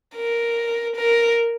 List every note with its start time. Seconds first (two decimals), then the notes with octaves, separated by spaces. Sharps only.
0.15 A#4
0.96 A#4